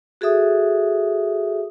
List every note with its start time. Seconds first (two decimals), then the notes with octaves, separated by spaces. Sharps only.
0.21 F#4 G#4 A4 E5 D#6